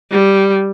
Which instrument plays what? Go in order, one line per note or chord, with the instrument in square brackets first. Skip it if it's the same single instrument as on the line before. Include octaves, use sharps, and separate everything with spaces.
[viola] G3